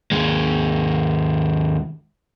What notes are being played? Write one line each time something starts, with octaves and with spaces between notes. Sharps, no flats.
D#2 G#3